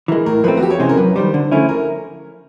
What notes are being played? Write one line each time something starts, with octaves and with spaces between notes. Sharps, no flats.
E3 G#3 A#4
A2 A#4
F3 A3 C4 B4
F#4
F2 G4
C#5
C3 E3 G#3 C#4 C5
A#4
F#2 B4
D#3 G3 C5
D3
F3 A3 C#4 E4
A#4